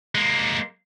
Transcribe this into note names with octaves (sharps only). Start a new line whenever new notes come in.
G#3 A#3